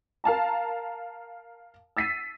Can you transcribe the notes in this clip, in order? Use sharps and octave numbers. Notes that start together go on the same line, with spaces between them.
A#4 F5 A5 A#5
E6 A6 B6 C7 D#7